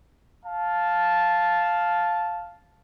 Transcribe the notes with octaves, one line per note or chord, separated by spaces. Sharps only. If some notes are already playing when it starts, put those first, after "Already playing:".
F5 A5